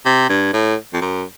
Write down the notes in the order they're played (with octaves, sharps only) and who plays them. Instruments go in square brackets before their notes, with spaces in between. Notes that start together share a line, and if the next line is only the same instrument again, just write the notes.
[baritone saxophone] C3
G2
A2
F2
F#2